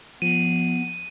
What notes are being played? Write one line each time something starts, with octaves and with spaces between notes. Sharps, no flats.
F3 B3 D#7